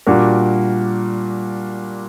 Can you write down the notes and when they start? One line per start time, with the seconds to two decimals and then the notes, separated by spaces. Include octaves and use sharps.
0.07 A#2 G3 D4 F#4 A#4